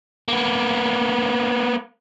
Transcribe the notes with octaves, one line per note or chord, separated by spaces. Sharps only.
A#3 B3